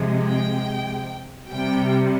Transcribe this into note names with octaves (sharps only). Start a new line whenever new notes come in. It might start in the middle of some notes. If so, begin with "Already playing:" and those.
Already playing: C3 F3 G#3
G5
C3 G3 G5